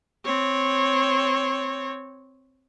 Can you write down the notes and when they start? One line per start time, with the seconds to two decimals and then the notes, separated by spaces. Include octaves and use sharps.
0.25 C4 C#5